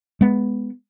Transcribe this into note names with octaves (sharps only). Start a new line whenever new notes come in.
G#3 B3